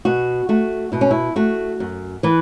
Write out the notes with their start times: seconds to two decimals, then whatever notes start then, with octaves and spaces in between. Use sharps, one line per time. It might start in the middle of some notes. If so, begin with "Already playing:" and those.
0.05 B2 F#4
0.49 A3 F#4
0.92 B2 E4
1.01 C#4
1.11 E4
1.36 A3 F#4
1.80 F#2
2.23 E3 B4